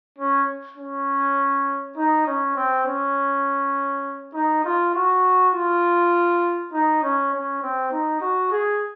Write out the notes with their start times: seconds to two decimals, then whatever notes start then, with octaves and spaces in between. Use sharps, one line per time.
0.18 C#4
0.77 C#4
1.97 D#4
2.26 C#4
2.56 C4
2.86 C#4
4.34 D#4
4.64 F4
4.94 F#4
5.53 F4
6.73 D#4
7.02 C#4
7.32 C#4
7.62 C4
7.91 D#4
8.21 F#4
8.51 G#4